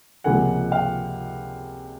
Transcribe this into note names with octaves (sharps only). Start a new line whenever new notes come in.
C#2 C3 F3 A#3 F#5 G#5
F5 G5